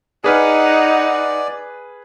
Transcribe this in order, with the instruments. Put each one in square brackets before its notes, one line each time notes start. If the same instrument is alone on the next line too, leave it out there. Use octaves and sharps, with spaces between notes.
[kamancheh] D#4 F#5 [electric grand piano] G#4 B4 F6 [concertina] D5